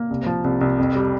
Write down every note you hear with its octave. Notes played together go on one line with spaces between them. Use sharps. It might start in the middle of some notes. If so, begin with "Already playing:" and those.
Already playing: A#3
C2
F3
C2
C2
F2
G3